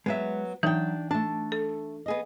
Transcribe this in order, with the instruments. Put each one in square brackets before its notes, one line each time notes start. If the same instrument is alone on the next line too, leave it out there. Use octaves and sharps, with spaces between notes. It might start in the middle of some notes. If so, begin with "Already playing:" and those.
[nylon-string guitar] F#3 B3 [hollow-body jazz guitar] G#3 E5
[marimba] E3 D#4 [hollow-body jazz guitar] F#3 [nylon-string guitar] D4 G5
[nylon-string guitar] A3 A5 [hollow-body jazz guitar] D4
[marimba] A4
[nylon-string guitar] B3 G#4 D#5